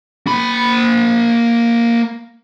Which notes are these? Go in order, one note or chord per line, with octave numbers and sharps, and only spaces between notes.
A#3 B5